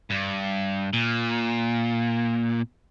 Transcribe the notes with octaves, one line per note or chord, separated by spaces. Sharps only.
G2
A#2